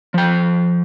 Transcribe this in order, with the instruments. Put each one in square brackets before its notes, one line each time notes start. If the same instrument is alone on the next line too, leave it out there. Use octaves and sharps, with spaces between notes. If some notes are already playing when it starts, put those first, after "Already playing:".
[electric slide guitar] F3 G5